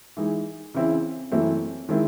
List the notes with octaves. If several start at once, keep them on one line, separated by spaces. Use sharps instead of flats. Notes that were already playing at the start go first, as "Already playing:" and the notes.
E3 G#3 D#4 G#4
C#3 E3 C4 E4
F#2 E3 A3 C4 E4
D#3 G#3 C4 E4